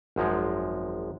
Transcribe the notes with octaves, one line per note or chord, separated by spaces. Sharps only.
G#1 F#2 F3 G#3